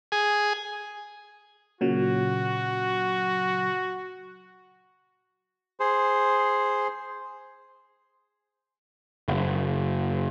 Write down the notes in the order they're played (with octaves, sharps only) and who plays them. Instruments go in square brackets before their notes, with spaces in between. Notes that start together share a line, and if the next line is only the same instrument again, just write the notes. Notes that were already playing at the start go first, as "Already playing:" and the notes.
[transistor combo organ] G#4
[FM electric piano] A#2 C#3 F#3 [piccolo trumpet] F#4
[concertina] G#4 C5
[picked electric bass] F#1